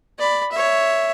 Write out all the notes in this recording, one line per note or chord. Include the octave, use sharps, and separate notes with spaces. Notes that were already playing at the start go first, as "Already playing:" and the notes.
D5 B5
C#5 E5